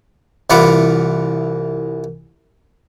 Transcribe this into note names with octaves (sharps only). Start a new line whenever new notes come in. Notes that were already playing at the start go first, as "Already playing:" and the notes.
C2 E3 F4 B4 F#5 D6